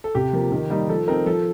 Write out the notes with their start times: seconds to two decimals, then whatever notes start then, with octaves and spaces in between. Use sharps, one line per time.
0.04 A4
0.15 C3 G4
0.33 F3 A#3
0.52 D#3
0.70 G3 A#3 D#4
0.89 F3 A4
1.07 C4 D#4 A#4
1.26 F3 A4